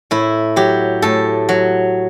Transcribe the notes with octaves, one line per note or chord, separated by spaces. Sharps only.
A2 E4
F#3 G4
A2 A4
F#3